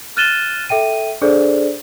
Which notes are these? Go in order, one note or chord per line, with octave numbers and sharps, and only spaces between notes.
F6 F#6 A6 D#7 E7 G7
A4 E5 G5 D#7
D4 G#4 A4 C5 D5